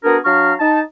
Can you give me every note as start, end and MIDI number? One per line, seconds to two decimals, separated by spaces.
0.04 0.18 59
0.04 0.18 62
0.04 0.18 66
0.04 0.18 68
0.04 0.18 70
0.25 0.54 54
0.25 0.54 62
0.25 0.54 77
0.25 0.54 82
0.25 0.54 85
0.25 0.54 89
0.60 0.80 63
0.60 0.80 81